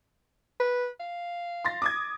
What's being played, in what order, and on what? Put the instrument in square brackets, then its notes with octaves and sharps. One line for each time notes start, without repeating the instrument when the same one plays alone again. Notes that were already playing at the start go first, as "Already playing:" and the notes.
[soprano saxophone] B4
F5
[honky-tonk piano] C6 A6 A#6
D6 D#6 G#6